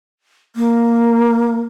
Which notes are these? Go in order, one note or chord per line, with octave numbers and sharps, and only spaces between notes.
A#3